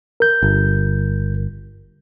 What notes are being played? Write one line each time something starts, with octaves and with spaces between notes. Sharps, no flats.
A#4 G6
G1